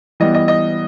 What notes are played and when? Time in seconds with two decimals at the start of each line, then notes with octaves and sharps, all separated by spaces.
0.20 E3 G3 B3 D#5
0.34 D#5
0.48 D#5